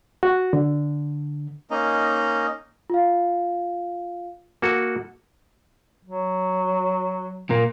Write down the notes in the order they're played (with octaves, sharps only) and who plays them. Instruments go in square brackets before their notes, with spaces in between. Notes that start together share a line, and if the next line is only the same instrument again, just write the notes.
[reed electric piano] F#4
D3
[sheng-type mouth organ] A#3 C#4 D#4 D#5 A#5
[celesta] F4 F5
[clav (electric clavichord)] A#3 F#4 A4
[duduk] F#3
[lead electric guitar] A#2 A#3